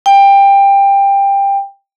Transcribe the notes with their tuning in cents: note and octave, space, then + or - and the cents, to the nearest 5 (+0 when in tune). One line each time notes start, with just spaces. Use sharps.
G5 +20